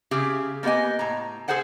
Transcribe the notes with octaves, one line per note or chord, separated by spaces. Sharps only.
C#3 G4 G#4 E5
A#3 B3 G4 D#5 G#5
A2 A#5
G#4 A4 C5 F#5 G#5